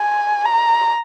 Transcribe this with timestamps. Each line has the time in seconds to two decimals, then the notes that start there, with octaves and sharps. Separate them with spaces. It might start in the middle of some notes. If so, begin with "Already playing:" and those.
Already playing: G#5
0.45 A#5